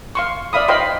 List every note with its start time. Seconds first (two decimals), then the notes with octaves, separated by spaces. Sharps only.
0.15 F5 C6 C#6
0.53 D5 E5 F5 B5 D#6
0.68 C5 D#5 F5 G5 B5 C6